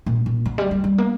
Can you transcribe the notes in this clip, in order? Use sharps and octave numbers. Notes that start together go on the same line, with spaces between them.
A#2
A#2
D3
G3
G3
G3
A#3